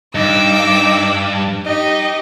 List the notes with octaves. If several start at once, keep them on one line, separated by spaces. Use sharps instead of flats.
G2 D#4 D6 E6
D#4 G4 D#5